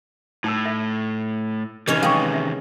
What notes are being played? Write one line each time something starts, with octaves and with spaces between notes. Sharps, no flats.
A2 D#4 A5 E6
E5
C3 D#3 E3 C#4 G4 C#5 D#5
G#3 G#4 F5 G5 C#6
E5